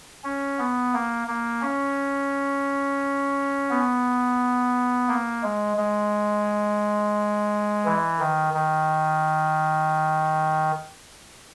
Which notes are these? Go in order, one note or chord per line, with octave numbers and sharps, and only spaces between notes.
C#4
B3
A#3
A#3
C#4
B3
A#3
G#3
G#3
E3
D#3
D#3